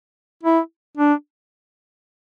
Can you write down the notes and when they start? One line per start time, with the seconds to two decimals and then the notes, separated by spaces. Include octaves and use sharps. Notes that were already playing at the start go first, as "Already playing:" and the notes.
0.43 E4
0.97 D4